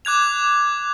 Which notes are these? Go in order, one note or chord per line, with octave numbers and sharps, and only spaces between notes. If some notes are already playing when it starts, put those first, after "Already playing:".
D6 F#6 G#6 F7